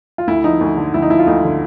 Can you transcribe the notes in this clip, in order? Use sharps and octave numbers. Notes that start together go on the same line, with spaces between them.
F4
D2 E4
F3 D#4
D2
D3
D2 E4
D#4
F3 E4
F4
D2 D#4
D3